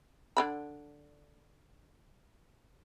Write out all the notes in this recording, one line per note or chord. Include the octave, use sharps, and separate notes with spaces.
D3 D4 B5